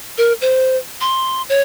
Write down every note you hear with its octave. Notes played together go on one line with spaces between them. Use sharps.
A#4
C5
C6
C#5